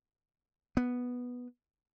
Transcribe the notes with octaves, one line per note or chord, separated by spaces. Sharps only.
B3